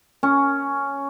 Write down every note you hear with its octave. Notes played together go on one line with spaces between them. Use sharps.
C#4